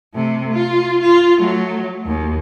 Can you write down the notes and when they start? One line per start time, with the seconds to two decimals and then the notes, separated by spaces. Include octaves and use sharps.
0.14 C3 A3
0.52 F4
1.02 F4
1.40 F#3 A3
2.06 D#2